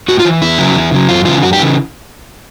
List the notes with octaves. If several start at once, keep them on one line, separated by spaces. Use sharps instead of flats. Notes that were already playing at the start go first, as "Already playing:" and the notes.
A2 F#4
F4
E3
E2 E4
C#3 F#3
E2
C#3 F#3
F#2 F4
C#3 E3 F4
F#2 F#4
G4
C#3 E3